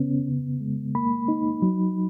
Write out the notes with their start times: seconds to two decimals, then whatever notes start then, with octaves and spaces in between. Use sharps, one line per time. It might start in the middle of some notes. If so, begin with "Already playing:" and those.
Already playing: C#3 B3 C#4
0.27 C#3
0.61 G#3
0.95 A#3 B5
1.28 D#4
1.62 F#3